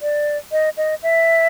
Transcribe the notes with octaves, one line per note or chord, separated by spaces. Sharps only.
D5
D#5
D#5
E5